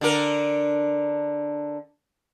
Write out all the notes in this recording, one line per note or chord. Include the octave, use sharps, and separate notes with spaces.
D3 D4 A#4